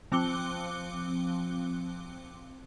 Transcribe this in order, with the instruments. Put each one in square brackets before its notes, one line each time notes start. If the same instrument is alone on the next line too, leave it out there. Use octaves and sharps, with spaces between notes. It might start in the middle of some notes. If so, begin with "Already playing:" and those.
[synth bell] F3 C4 D6 F#6 C#7 G7